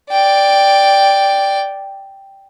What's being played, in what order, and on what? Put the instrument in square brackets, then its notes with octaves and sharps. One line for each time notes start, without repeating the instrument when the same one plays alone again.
[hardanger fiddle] D5 G5